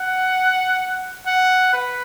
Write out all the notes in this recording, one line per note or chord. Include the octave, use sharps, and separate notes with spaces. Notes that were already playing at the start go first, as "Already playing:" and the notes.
Already playing: F#5
F#5
B4